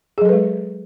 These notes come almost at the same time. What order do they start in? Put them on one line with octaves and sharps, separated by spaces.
G#4 F#3 A4 B4 G#3